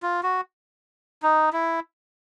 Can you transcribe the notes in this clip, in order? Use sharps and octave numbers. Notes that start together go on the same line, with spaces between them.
F4
F#4
D#4
E4